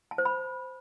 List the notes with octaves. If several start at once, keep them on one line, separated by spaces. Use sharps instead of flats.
A5
C5
B5